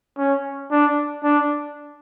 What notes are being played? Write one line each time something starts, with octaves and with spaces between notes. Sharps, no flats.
C#4
D4
D4